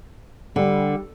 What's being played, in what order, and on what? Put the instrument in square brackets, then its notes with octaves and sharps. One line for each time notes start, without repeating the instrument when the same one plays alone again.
[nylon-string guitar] D3 [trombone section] G3